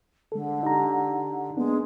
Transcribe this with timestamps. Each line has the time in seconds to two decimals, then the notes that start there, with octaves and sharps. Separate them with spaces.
0.32 D3 G#3 A4
0.63 D#4 G4 A#5
1.57 G#3 A#3 B3 D4